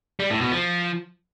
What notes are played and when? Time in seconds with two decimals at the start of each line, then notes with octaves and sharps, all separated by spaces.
0.20 G3
0.30 A2
0.41 B2
0.52 F3